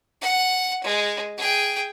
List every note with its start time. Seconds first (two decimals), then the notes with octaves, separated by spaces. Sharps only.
0.22 F#5
0.84 G#3
1.38 G#4 G5